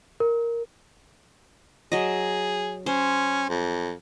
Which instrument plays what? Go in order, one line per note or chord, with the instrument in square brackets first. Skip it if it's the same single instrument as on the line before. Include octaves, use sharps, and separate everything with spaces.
[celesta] A#4
[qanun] F#3 D#5 [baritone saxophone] G#4
[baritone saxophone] C#4 [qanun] C5
[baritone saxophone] F2